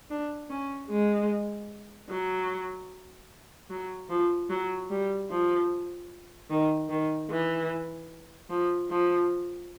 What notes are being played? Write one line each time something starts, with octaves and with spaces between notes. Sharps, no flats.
D4
C#4
G#3
F#3
F#3
F3
F#3
G3
F3
D#3
D#3
E3
F3
F3